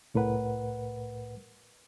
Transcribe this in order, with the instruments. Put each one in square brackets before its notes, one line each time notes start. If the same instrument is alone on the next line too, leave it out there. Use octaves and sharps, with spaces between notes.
[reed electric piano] C2 A2 A#4 B4 F#5